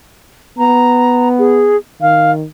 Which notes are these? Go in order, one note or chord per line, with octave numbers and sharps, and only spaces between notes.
B3 A#5
G#4
D#3 F5